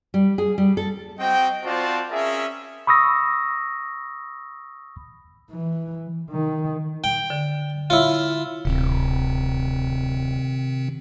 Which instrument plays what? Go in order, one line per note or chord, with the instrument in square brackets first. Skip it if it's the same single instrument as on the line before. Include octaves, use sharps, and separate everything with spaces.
[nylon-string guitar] G3
G#4
G3
A4
[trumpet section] C4 F#4 D#5 G5
C4 F4 F#4 C5 D5 A5
C#4 G#4 A#4 E5
[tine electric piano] B5 C#6 D#6 E6 A#6
[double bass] E3
D#3
[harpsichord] G5
[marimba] D3
[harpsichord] E4 F4 [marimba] C#5
[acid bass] D1 [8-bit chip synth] C3 D#3 C4